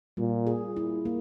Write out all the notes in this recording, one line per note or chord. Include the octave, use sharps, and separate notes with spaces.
A#2 G3
G#4
E4
A#3